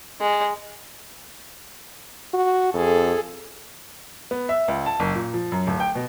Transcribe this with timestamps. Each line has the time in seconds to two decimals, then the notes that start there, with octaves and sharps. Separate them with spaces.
0.21 G#3
2.34 F#4
2.74 F2 G#4 A4
4.31 B3
4.49 E5
4.68 C#2
4.86 A5
5.00 F#1
5.15 A#2
5.34 F3
5.52 F#2
5.67 D1
5.80 G5
5.95 B2